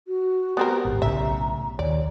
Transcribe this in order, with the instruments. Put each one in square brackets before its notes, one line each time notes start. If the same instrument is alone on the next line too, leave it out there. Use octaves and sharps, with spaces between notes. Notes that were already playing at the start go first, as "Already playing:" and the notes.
[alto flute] F#4
[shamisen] B3 C4 A#4 [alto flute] G4
[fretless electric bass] D1 G#1
[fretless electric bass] B1 A2 C#3 [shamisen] E5 [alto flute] A#5
[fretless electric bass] D#2 [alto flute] C#5 [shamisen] D5